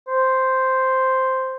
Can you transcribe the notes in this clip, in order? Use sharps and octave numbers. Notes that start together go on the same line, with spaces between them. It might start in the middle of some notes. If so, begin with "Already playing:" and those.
C5